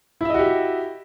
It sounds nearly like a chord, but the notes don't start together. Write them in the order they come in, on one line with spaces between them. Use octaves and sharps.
E4 E5 D#5 F#4 G4